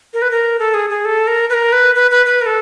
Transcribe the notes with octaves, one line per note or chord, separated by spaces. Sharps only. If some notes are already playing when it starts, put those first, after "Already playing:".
A#4
B4
A#4
A4
G#4
G#4
A4
A#4
B4
A#4
B4
B4
B4
B4
A#4
A4